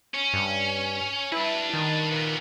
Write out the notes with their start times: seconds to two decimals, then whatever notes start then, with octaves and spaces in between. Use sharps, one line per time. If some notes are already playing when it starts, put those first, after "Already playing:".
0.14 C#4
0.33 G2
1.32 D4 E4 B4
1.74 D#3
2.11 A#2 B3